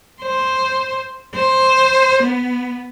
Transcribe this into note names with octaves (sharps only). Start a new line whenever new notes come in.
C5
C5
B3